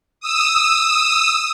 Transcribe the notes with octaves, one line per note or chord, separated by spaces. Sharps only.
D#6 E6